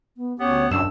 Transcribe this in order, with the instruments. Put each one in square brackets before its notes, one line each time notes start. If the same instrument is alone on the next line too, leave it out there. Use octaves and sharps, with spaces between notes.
[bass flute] B3
[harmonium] D2 C#4 G4 [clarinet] B3 [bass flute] C#5
[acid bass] F#2 [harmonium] C#3 [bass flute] D4 [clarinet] E6